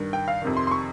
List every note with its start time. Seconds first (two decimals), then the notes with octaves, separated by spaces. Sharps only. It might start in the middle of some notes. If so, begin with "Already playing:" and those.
Already playing: G2 D#3
0.13 G5
0.28 F5
0.42 F2 C3 D#3
0.57 C6
0.67 C6
0.71 C#6